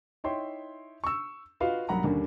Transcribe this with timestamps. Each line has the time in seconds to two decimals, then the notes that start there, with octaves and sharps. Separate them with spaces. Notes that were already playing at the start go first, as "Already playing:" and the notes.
0.24 D#4 E4 C#5 E5 G5 C6
1.04 C#6 E6
1.60 F4 F#4 B4 D#5 F5
1.88 B1 G2 A#3 F#5 A#5 B5
2.04 D#2 D3 G3 A#3 C#4 D4